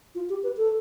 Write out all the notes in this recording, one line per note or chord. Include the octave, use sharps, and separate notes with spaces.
F4
G4
B4
A4